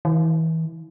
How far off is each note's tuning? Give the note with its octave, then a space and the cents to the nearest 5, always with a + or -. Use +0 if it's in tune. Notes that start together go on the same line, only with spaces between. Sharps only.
E3 -35